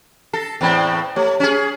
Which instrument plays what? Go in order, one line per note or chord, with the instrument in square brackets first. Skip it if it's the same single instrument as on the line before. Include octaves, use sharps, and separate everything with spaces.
[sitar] A4 [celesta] A#6 C7
[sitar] E2 A2 C4 [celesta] G5 B5
[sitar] A3 [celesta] G4 C#5
[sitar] C#4 G#4